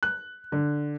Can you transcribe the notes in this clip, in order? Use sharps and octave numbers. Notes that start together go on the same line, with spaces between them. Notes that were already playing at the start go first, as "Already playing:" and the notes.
F#6
D3